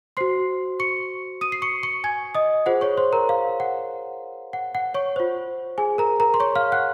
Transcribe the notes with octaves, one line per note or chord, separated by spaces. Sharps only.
F#4 C5 C6 C7
C#6 C#7
D#6 D#7
C7
C#6 C#7
C#6 C#7
G#5 G#6
D#5 D#6
F4 G#4 C5 F#5
C#5 C#6
C5 C6
A#4 A#5
F5
F#5
F#5
F#5
C#5 C#6
F4 C5
G#4 G#5
A#4 A#5
A#4 A#5
C6
C#5 C#6
F5 F6
F#5 F#6